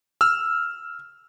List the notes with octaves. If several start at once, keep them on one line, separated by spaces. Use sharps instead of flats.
E6 F6